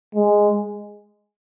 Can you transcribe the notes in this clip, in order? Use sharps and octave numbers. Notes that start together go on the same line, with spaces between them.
G#3